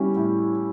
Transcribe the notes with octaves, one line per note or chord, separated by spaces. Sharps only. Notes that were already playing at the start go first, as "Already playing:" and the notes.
Already playing: G3 C#4 E4 G4
A2